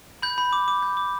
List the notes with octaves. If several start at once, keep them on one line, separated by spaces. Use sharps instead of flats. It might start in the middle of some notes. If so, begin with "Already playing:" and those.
B5 G6
B5
D6
D6
G6
D6